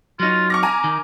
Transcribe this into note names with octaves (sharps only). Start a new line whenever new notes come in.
F#3 D#4 F4
C#6 D6 F6 A#6
G#5 A#5
D#3